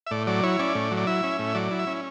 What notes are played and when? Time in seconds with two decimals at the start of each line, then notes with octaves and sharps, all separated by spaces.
0.07 E5
0.11 A2 D5
0.27 F#3 D5
0.43 E4 C#5
0.59 C#4 D5
0.75 A2
0.91 F#3
0.97 D5
1.07 E4 E5
1.23 C#4
1.39 A2
1.55 F#3 D5
1.71 E4
1.79 E5
1.87 C#4